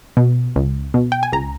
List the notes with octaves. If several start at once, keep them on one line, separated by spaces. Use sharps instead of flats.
B2
C#2
B2
G5
G#5
C#2 A#5